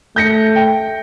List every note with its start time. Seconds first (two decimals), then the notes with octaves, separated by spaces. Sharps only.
0.16 A3 G6 A#6 C#7
0.56 G5